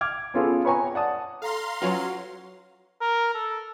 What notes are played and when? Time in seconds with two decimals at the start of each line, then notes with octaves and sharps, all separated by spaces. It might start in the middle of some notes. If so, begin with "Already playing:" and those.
0.01 D6 F6 G#6
0.34 B3 C#4 F4 G#4 A4 B4
0.65 B4 C#5 G5 G#5 A#5 C#6
0.94 D5 F#5 A5 D#6
1.42 A4 F5 A#5 C6
1.82 F#3 C#4 F4 F#4 B4 C#5
3.01 A#4
3.35 A4